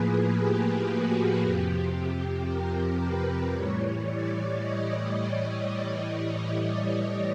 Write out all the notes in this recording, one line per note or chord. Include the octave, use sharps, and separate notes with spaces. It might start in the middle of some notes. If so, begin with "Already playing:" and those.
Already playing: A2 F3 A#3 G#4 B4
G4
F#4
F2 C3 F3 G4
A#4
B4
A2 E3 G3 C#5
D5
D#5
D#5